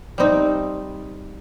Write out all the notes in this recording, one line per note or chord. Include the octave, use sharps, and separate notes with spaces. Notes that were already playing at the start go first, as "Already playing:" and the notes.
G3 C4 D#4